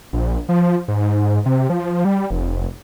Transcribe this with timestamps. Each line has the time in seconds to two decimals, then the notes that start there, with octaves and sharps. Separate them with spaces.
0.13 A#1
0.49 F3
0.88 G#2
1.46 C3
1.70 F3
2.05 G3
2.30 F1